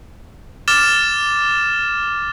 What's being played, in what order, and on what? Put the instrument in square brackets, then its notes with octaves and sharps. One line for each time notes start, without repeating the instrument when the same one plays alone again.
[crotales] D6 F6 A6 E7